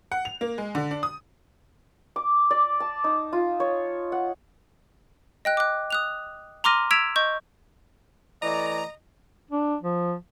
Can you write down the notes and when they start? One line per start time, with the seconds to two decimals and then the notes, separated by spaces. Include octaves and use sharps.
0.12 F#5
0.25 F7
0.41 A#3
0.58 G#3
0.75 D3
0.91 D4
1.03 D#6
2.16 D6
2.51 D5
2.80 A5
3.04 D#4
3.33 F4
3.60 C#5
4.12 F#5
5.45 D#5 G5 F#6
5.57 D6 F#6
5.90 D#6 F#6 F7
6.64 A#5 C6 D6 F6 A#6 D#7
6.91 E6 G#6 B6 D7 E7 F7
7.16 D#5 C#6 G6
8.42 E3 A3 D5 D#5 A#5
9.51 D4
9.82 F3